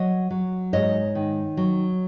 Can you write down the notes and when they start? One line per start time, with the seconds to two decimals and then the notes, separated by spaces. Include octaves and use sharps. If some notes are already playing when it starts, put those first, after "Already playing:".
Already playing: F#3 C#5 D#5
0.31 F#3
0.73 G#2 C#5 D#5
1.15 D#3
1.57 F#3